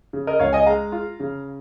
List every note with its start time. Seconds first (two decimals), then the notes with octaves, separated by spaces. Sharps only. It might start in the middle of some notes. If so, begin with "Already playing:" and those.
0.13 C#3
0.27 A#4 D#5
0.39 C#2 C#5 F5
0.53 D#5 G#5
0.66 G#3 F5 A#5
0.92 F4
1.20 C#3